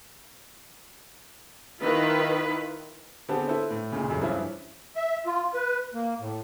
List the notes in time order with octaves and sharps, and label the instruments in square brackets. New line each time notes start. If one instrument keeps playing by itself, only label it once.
[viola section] D#3 E4 F4 B4
[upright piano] D3 B3 C4 G4 G#4 A5
E4 A4 B4 C5
A2
C#2 A#2 C#3
F1 C#2 F#2
G2 E3 F3 C#4 E4 F4
[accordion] E5
F4
B4
A#3
A2